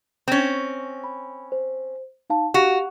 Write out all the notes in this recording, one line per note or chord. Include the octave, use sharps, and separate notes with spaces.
C4 C#4 A#6
B5
C5
D#4 F5 A5
F#4 G4 F5 F7